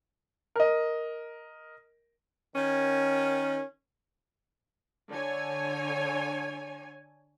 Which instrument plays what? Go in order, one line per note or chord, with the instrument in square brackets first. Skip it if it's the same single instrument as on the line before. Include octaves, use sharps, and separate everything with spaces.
[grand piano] A#4 D#5
[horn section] D#3 C#4
[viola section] D3 C#5 G#5